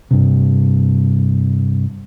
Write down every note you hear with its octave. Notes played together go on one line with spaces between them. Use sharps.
G2 C3